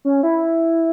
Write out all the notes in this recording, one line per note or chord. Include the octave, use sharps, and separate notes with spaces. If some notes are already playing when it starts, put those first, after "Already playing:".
C#4
E4